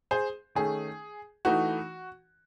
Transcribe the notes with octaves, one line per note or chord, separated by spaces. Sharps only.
G#4 C5
D#3 A3 C#4 G#4
E3 A3 D#4 F#4